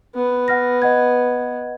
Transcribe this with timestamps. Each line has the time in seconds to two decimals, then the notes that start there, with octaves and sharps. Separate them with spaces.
0.15 B3
0.48 F#5 F6 A#6
0.82 D#5 F#5 G#6